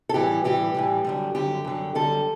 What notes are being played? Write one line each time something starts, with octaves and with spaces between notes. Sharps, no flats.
A4
A2 E3 G3 G4
A2 E3 G3 G4
A2 E3 G3
F#2 D3 G3
F#2 D3 G3 G4
F#2 D3 G3
F#2 D3 G3 A4